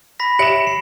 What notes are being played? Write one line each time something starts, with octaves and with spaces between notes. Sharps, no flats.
B5 A#6 B6
G4 C#5 E5 C#7 D7 E7 F#7
C7